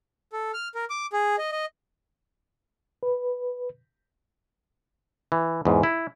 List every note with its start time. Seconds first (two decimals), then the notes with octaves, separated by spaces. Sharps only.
0.33 A4
0.54 F6
0.75 A#4
0.90 D6
1.13 G#4
1.38 D#5
1.52 D#5
3.03 B4
5.32 E3
5.65 E2 G#2
5.83 E4